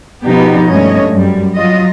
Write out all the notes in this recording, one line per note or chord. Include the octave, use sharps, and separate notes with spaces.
B2 F3 B3 D#4 G4
G2 G#3 A3 C#4 C#5 D#5
F#2 G3
F#3 F4 D#5